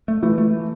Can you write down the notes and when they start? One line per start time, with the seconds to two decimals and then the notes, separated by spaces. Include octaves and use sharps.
0.08 A3
0.22 E3 A3
0.38 A3